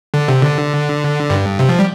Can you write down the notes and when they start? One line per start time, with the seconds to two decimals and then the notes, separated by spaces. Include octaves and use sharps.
0.14 D3
0.28 C3
0.43 D3
1.30 G2
1.59 C3
1.69 F3
1.79 G3